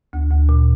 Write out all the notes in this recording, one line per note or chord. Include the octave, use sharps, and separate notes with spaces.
D2
D2
A#2